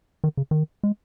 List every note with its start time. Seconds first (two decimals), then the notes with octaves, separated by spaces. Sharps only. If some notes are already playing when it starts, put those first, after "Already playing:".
0.24 D#3
0.37 C#3
0.51 D#3
0.83 G#3